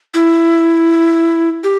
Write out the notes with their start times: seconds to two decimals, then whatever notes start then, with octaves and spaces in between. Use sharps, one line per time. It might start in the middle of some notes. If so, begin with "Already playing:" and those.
0.14 E4
1.64 G4